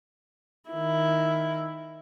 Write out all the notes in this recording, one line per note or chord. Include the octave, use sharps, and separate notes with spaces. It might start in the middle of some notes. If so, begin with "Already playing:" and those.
D#3 E4